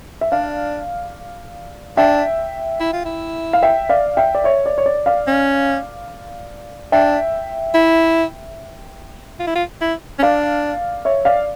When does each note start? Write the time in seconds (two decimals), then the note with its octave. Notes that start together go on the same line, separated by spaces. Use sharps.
0.21 E5
0.32 D4 D5 F5
1.97 D4 E5 G5
2.80 E4
2.93 F4
3.05 E4
3.53 F5
3.63 E5 G5
3.89 D5 F5
4.17 E5 G5
4.35 D5
4.44 C#5 E5
4.66 D5
4.78 C#5
4.86 D5
5.06 D5 F5
5.27 C#4
6.92 D4 E5 G5
7.74 E4
9.39 F4
9.47 E4
9.55 F4
9.81 E4
10.19 C#4
10.23 D4 D5 F5
11.05 C#5 E5
11.25 D5 F5